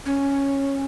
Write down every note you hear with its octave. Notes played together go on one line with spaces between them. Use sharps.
C#4